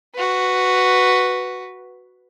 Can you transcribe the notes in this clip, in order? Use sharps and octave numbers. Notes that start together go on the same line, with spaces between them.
F#4 B4